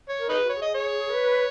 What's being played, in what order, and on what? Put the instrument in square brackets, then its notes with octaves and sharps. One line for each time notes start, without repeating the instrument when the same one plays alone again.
[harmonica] C#5
[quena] A#4
[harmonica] D#4 B4 [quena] G#4
[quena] F#4
[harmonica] C#5
[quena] G#4
[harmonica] D#5
C#5
[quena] B4